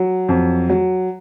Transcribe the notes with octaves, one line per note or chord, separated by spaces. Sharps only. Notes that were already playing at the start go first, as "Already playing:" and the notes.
Already playing: F#3
F2
F#3